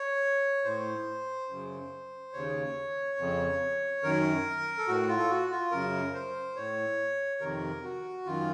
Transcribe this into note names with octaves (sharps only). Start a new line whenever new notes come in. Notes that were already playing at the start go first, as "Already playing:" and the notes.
Already playing: C#5
A2 C5
F#2 C#3
D#2 C#3 C#5
F2 C#3
F#2 D#3 A#4
A4
A2 F#4
F4
A4
F#4
F4
F#2 C#3 A#4
C5
A2 C#5
F2 C3 D#3 A#4
F#4
F#2 D#3 F4